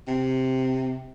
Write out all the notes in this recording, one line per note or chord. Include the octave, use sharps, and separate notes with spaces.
C3